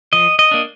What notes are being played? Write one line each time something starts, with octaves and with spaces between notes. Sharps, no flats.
F3 D#5
D#5
A#3 D4